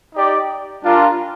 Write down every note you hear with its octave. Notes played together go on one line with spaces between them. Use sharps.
D#4 G4 D5
G3 D4 F4 A#4